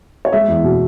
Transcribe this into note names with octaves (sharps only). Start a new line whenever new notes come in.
C#5
G#3 E5
E2
B2